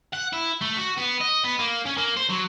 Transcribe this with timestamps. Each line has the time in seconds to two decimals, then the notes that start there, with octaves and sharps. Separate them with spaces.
0.13 F#5
0.33 E4
0.61 A3
0.77 F#4
0.98 B3
1.21 D#5
1.44 B3
1.59 A#3
1.86 C#4
1.97 A#3
2.17 C5
2.30 F#3